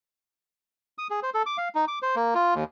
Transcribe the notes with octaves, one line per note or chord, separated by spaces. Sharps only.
D#6
G#4
C5
A4
D6
F5
D#4
D6
C5
A#3
F4
D#2